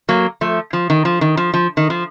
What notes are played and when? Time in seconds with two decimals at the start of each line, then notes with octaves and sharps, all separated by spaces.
0.09 F#3 A#3
0.41 F3 A3
0.73 F3
0.90 D#3
1.05 F3
1.21 D#3
1.37 F3
1.54 F3
1.77 D#3
1.90 F3